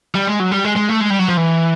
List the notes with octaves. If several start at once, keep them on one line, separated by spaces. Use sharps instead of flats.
G3
G#3
F#3
G3
G#3
G#3
A3
G#3
G3
F#3
F3
E3